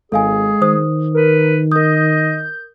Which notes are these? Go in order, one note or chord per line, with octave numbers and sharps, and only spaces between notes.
G#1 G#3 G#4 A4 F5 G#5
D#3 C5 D#6
A#4 B4
A#4 D#5 D#6 G6